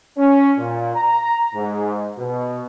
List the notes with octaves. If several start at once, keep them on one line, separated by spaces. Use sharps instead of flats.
C#4
A#2
A#5
G#2
B2